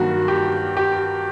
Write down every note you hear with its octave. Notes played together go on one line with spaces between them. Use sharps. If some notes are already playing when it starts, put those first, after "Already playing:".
Already playing: G2 D#3 F#3 A#3 F#4
G4
G4